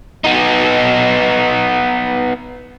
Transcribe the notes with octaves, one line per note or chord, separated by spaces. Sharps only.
B3 D#4